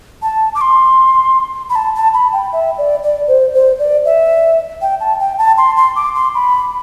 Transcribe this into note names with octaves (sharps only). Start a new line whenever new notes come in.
A5
D6
C6
B5
A5
A5
B5
G5
E5
D5
D5
C5
C5
D5
E5
G5
A5
G5
A5
C6
C6
D6
C6
B5